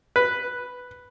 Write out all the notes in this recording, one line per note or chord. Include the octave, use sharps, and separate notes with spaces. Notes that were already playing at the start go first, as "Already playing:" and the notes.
B4